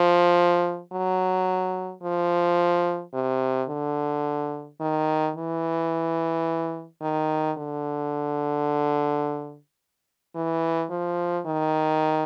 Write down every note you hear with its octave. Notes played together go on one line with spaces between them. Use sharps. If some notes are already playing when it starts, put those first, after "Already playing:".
Already playing: F3
F#3
F3
C3
D3
D#3
E3
D#3
D3
E3
F3
D#3